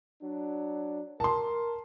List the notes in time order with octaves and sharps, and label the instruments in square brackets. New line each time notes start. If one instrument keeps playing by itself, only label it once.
[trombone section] F#3 D4
[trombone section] A#4 [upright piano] A5 C6